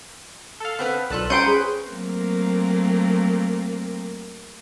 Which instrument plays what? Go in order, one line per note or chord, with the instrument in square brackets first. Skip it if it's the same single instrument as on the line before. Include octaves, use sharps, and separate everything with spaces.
[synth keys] A4 F5
[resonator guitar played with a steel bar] B3 C4 B4
[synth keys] B1 A5 F#6 [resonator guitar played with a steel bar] F4 A4 B4 [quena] D5
[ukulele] C#4 C5 G5 [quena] A#5 [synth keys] G6 C#7 D#7
[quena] G#4 [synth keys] B4
[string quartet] F#3 A3 A#3 C4